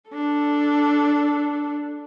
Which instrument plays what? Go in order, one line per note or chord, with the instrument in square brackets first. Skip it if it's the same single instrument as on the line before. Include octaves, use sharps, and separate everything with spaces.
[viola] D4 A4